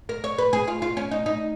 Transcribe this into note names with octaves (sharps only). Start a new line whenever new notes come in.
A#4
C#5
B4
G#4
F4
F4
C#4
D#4
D#4